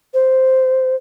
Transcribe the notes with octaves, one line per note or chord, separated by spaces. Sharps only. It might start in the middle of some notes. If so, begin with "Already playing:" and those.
C5